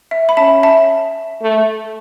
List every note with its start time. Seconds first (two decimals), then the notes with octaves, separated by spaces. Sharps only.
0.11 E5
0.29 B5
0.37 C#4 E5 A5
0.63 E5 A5
1.42 A3